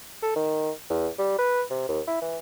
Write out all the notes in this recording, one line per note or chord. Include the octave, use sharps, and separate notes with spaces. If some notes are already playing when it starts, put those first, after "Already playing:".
A4
D#3
E2
G3
B4
C3
D#2
E4
E3